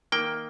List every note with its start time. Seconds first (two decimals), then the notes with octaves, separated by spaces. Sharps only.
0.12 D#3 A#3 G5